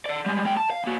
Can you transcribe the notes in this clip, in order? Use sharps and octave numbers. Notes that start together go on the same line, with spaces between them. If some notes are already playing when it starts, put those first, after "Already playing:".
D5 F#5
G3 G#3
G#3 G5
A5
F5
A#3 F#4